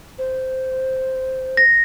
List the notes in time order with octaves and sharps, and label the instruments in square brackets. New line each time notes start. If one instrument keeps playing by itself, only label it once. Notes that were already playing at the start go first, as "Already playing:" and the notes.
[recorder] C5
[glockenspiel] A#6